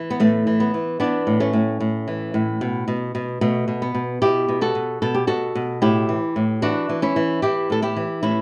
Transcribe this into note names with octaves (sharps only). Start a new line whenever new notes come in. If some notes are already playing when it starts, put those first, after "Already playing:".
Already playing: E3
B3
A2 A3
E3
B3
E3
E3 B3 D4
A2
A3 C#4
A2
A2
E3
A2
B2
B2
B2
B2 A3
B2
B3
B2
B2 E4 G4
B2
F#4 A4
B2
B2 A4
G4
B2 F#4 A4
B2
A2 E4 G4
E3
A2
E3 D4 F#4
E3
C#4 E4
E3
E3 E4 G4
A2 A4
E4 G4
E3
A2 C#4 E4